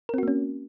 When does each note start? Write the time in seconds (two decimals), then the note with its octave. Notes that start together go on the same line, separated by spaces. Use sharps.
0.09 A#4
0.14 C4
0.18 F#4
0.23 A#3
0.28 C#4